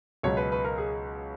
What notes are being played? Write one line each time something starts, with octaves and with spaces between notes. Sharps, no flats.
C#2 B2 F#3 C#5
B4
B4
A#4
G#4